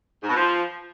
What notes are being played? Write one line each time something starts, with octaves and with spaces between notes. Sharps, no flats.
G#2
B2
F3